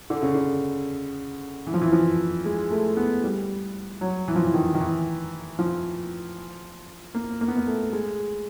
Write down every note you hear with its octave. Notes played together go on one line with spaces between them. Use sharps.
D3
C#3
D3
E3
F3
E3
F3
G#3
A3
B3
G3
F#3
E3
F3
E3
D#3
D#3
E3
F3
A#3
A#3
B3
A#3
A3
G#3